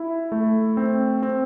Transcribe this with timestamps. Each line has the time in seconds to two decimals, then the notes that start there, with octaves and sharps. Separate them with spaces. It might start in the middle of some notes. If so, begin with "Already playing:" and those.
Already playing: E4
0.32 A3
0.77 C4
1.22 C4